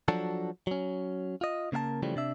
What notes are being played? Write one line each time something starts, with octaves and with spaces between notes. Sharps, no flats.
F3 F#3 D4 F#4 A4
F#3 C#4
F4 D#5
C#3 A#3 A#4 F5 A5
C#3 E3 F3 G3 A3
C3 D4 E5